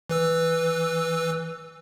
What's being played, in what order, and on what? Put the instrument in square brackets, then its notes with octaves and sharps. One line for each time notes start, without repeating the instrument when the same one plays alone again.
[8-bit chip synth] E3 B4 E6